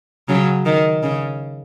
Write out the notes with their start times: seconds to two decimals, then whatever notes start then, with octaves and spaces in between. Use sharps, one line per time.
0.29 C#3 F#3
0.66 D#3
1.03 C#3